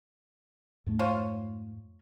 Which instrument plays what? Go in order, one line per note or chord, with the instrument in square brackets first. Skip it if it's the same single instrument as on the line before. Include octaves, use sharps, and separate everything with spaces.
[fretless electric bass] F2 G#2 A3
[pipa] F4 C5 C#5